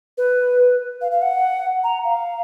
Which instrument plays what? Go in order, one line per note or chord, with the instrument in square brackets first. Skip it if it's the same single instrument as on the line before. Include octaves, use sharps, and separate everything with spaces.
[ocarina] B4
F5
F5
F#5
A#5
F5